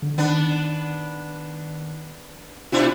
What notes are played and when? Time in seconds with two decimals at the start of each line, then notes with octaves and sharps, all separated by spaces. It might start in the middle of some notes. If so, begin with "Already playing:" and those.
0.02 D3
0.18 D#3 B3 D4
2.72 B2 D4 E4 F4